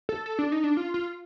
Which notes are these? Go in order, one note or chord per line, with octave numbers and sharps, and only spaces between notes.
A4
A4
D4
D#4
D4
F4
F4